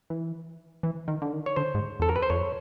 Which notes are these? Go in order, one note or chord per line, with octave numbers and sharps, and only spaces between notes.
E3
E3
D#3
D3
D#3
C#5
D3 C5
G#2
E2 A4
A#4
F2
B4
C5
F2 C#5